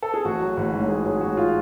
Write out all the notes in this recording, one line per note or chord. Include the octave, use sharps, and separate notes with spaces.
A4
G#4
A1 F#4
F#3
A1 F#4
G#2
A1 G#4
F#3 G#4
A1 F#4
F4